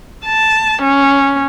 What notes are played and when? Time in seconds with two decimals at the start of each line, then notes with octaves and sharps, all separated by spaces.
0.25 A5
0.82 C#4